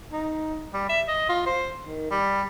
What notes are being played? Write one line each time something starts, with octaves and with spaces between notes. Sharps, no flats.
D#4
G3
E5
D#5
F4
C5
D#3
G3